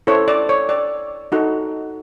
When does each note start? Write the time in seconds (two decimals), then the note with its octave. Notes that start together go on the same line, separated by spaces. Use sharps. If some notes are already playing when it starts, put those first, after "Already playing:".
0.07 C#4 E4 A4 C5 C#5
0.28 D5
0.49 C#5
0.69 D5
1.32 D#4 F#4 A4